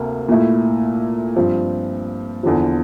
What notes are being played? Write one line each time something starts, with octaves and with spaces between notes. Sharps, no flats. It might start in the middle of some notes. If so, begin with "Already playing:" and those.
Already playing: D2 C3 A#3
A#2 A3 E4
G2 F3 C4
E2 D3 F3